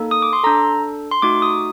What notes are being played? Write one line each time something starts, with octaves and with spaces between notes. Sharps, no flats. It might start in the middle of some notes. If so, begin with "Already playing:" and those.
Already playing: A#3 D#4 A4
D#6
D6
C6
D4 A4 A#5
C6
A3 D#4 F#4 D6
D#6